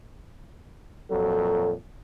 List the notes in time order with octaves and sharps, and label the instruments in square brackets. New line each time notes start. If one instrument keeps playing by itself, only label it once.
[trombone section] F2 A#2 F#3 [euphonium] A4